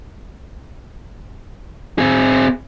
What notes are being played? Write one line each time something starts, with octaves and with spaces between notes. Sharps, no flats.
C4 G#4